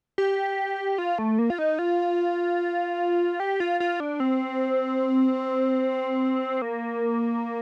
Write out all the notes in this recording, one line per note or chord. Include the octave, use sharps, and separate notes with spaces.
G4
F4
A3
A#3
F4
D#4
F4
G4
F4
F4
D4
C4
A#3